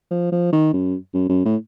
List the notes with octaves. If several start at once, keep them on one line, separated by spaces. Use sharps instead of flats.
F3
F3
D#3
F#2
F#2
F#2
A2